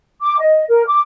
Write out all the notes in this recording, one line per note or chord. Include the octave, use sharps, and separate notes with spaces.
D6
D#5
A#4
D6